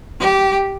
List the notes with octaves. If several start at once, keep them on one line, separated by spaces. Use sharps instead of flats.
G4